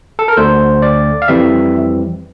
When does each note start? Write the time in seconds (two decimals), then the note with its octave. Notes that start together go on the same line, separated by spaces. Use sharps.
0.19 A4
0.28 A#4
0.37 D2 D3 A3 D4 C5
0.82 D5
1.22 F5
1.28 F2 E3 G3 C4 E5